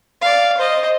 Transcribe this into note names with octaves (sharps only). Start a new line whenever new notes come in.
D5 F5
C5 D#5